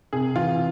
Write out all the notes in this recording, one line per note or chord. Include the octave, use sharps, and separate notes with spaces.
C3 G#4
E3 F4